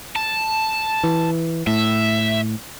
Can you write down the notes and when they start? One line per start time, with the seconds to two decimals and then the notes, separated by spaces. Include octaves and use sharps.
0.16 A5
1.04 E3
1.67 A2 E5